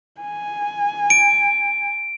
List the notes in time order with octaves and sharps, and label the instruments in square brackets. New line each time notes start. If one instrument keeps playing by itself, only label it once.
[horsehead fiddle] G#5
[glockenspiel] D7